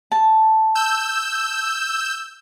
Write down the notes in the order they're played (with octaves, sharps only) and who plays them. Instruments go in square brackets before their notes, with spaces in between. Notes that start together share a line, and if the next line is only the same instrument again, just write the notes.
[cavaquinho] A5
[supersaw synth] E6 G6